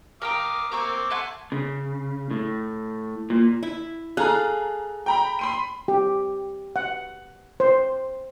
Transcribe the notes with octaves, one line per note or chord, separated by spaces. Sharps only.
A#4 F5 G5 A#5 D6 D#6
A#3 C4 A#5 C#6 D6 E6
A3 F#5 G#5 A5 C6
C#3
A2
A#2
E4
G#4 A4 F5 A#5 F#6
G5 A#5 B5
B5 C6 D#7
G4
F#5
C5